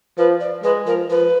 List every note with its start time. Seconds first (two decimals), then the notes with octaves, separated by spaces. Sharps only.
0.18 F3 B4
0.40 D5
0.63 G#3 B4
0.87 F3 A#4
1.09 F3 B4